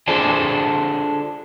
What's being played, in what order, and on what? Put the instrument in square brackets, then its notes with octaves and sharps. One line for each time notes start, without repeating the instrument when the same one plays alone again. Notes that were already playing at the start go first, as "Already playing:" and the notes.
[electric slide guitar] D4 F4 G#4 A4 C5 D5